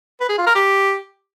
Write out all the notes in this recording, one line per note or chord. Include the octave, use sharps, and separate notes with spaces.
B4
G#4
F4
A#4
G4